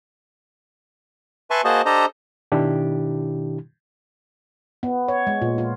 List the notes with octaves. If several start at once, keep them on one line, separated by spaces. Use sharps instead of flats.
B4 E5 G#5 A5 C6 C#6
A#3 F#4 G#4 C5 D#5 A5
D4 G4 A4 C5 D#5 A#5
B2 D#3 D4 E4 G4
B3
C#5
G#3
A#2
F4